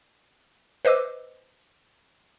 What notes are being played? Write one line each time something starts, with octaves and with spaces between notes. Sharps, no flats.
B4 C5 D#5 D6 E6